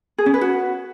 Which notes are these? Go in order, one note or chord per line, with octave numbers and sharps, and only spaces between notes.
G#4
C#4
B4
F#4